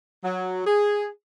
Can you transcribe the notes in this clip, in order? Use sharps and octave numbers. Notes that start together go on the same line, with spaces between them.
F#3
G#4